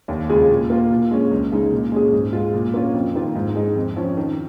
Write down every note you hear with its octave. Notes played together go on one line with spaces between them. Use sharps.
D#2
C#3 G#3 F4 G#4
A#2
A#3 F4
A#2
G#3 C#4
C#2
C#3 G#3 D#4
A#2
G#3 C#4 G#4
G#2
G#3 F4
A#2
A#3 C#4 F4
F2
D#3 A#3 F4
G#2
G#3 D#4
F2
F3 C#4
D#3